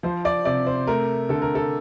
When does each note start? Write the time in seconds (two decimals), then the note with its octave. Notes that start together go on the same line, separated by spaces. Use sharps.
0.03 F3 C5
0.25 D5
0.45 C3 D5
0.67 C5
0.87 A3 A#4
1.29 D3 A4
1.42 A#4
1.55 A4